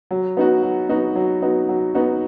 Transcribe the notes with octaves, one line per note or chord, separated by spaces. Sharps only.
F#3
B3 D#4 F#4
F#3
B3 D#4 F#4
F#3
B3 D#4 F#4
F#3
B3 D#4 F#4